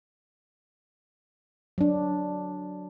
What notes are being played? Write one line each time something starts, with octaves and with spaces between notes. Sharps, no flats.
F#3 D4